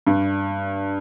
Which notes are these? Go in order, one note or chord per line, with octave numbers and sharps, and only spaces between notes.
G2